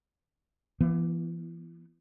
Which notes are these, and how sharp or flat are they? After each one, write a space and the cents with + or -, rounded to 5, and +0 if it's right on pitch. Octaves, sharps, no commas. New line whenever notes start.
E3 +30 B3 -25